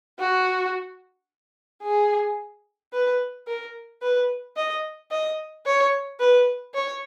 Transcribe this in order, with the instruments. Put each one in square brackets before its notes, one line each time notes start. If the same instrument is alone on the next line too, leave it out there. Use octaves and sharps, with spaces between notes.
[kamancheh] F#4
G#4
B4
A#4
B4
D#5
D#5
C#5
B4
C#5